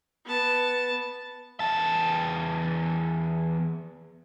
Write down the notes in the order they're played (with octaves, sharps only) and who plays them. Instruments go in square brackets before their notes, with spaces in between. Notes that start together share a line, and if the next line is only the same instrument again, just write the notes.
[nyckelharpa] B3 A5
[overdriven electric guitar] E2 A5